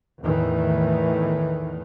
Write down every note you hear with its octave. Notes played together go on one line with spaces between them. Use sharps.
E2 A2 D#3 E3